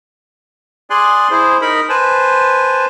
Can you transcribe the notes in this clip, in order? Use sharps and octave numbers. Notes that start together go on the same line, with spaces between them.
G#4 D5 G#5 C6 F#6
E4 G#4 C5
D#4 A#4 B5
B4 C5 G#5 A5